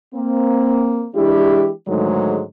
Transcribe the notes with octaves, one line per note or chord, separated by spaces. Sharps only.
A#3 C4
E3 G#3 D4 E4 G4
G#2 D3 D#3 F#3 G#3 A3